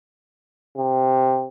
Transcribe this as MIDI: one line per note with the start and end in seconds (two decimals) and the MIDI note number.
0.77 1.47 48